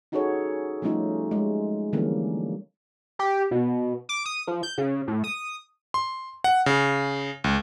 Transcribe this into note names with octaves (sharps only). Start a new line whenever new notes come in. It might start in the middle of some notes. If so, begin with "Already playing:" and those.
C#4 D#4 F#4 G#4 A4 C#5
F3 G3 A3 C#4 D#4 F4
G#3
D3 E3 F3 G3 A#3 C#4
G4
B2
D6
D#6
F3
G6
C#3
A2
D#6
C6
F#5
C#3
C#2